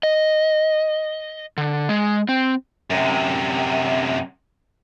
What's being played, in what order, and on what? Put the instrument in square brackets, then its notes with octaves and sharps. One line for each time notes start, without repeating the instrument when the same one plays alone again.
[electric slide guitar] D#5
D3
G#3
C4
[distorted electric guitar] F#2 C3